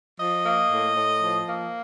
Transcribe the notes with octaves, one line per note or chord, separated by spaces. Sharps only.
F3 D#5
A#3
A2
A2
F3
A#3